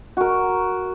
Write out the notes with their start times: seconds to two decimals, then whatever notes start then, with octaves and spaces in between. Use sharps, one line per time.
0.17 F#4 A#4